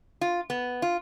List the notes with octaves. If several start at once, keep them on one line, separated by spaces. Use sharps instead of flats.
F4
B3
F4